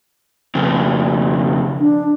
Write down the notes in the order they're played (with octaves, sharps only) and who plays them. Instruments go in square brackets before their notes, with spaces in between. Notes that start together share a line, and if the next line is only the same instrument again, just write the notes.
[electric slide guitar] F2 C#3
[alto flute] D4